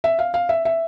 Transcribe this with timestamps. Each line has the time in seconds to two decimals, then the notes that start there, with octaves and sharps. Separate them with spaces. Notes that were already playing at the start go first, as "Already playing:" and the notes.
0.04 E5
0.19 F5
0.34 F5
0.49 E5
0.65 E5